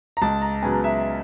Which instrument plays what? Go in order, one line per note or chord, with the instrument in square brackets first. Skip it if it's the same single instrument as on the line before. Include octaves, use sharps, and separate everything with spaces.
[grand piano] A#5
C#2 A5
A#5
C#3 F#3 B3 G#5
E5